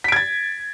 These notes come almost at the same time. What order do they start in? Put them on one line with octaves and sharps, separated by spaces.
B6 D7 G#6 A6